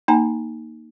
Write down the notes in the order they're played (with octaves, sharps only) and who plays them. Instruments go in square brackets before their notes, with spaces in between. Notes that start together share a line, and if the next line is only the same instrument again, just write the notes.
[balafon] A#3 D#4 G#5 A#5